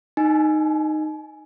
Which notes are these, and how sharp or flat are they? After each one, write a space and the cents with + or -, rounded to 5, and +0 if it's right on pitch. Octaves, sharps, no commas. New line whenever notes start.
D#4 -10 G#5 +10